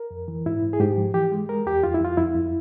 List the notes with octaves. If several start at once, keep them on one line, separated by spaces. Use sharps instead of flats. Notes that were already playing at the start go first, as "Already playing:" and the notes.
Already playing: A#4
F2
E3
G#2 E4
G#2
G#4
G#2 G4
F3
E3 G4
G#3
G#3 A#4
E2 G4
F2 F4
E4
F2 F4
F2 E4
F2